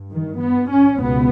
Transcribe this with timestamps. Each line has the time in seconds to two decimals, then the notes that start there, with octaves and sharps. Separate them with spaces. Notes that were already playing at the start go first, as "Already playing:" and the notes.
Already playing: G2
0.10 D#3
0.40 B3
0.70 C#4
1.00 C#2 B2 B3